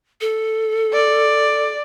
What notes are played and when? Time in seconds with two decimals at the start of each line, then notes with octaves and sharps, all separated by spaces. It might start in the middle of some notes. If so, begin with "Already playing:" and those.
0.21 A4
0.93 D5